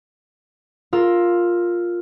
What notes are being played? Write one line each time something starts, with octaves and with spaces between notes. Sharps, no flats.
F4 A#4 E6